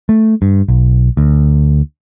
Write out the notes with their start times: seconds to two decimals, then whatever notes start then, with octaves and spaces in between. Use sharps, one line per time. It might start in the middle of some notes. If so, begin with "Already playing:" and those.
0.09 A3
0.42 G2
0.68 B1
1.17 D2